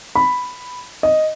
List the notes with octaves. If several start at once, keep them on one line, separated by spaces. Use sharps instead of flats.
B5
D#5